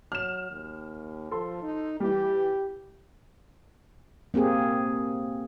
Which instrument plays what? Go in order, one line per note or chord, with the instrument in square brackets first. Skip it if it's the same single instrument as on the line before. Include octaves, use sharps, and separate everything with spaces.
[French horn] F#3 [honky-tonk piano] F6 E7
[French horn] D#2
[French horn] F3 [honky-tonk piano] A4 C6
[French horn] D#4
[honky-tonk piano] E3 G3 [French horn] G4
[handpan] A#3 C4 G4 G#4